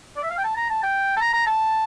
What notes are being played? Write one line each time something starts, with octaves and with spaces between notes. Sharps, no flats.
D5
E5
F5
G5
A5
A#5
A5
G5
A5
A#5
A#5
A5